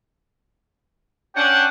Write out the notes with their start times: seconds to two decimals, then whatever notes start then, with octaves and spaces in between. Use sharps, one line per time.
1.36 C#4 D4 F#5 G5